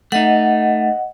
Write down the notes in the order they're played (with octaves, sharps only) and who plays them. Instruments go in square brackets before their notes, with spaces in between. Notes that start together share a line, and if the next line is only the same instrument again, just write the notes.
[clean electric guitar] A3 D#4 [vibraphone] D#5 F#5